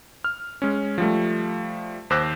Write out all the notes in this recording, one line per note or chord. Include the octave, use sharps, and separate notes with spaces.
F6
G#3 C#4
F3 G3 A3
D#2 C5 D6 E6 F#6 A#6